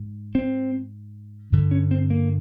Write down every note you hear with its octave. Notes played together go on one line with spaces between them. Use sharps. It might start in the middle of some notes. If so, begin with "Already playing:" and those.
Already playing: G#2
C4
G2 D3
C#4
C4
A#3